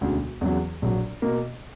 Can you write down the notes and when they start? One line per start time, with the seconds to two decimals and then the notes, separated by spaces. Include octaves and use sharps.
0.01 E1 D2 C#3
0.41 E2 C#3 F#3
0.82 A#1 A#2 F#3
1.22 B2 A#3